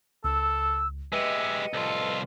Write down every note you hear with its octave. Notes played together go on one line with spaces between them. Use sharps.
C#2 A4 E6
G#3 G4 B4 D#5 E5 C#7 D#7
C2 F4 A4